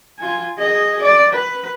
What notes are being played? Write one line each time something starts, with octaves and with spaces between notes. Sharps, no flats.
F4 G#5
G#4 D#5
D5
B4